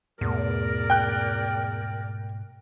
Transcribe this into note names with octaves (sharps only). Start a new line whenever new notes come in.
E2 G#2 B2 A3 A#4 D5
G5 F#6